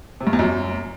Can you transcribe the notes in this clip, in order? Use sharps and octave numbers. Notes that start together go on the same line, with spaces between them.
C3
G2
E2
F#2